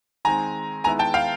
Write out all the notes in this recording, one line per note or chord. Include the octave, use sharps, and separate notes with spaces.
D#3 G#3 C4 G#5 A#5
D#3 G#3 B3 E4 G#5 A#5
G5 A5
F5 G5